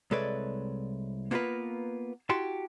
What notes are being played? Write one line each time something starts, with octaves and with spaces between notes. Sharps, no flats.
C2 G#3 A4 B4 C#5 D5
A#3 B3 F4 G#4 A#4 B4
E4 F#4 G4 A5 C6